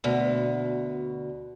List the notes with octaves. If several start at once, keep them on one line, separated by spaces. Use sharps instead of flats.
D2 B2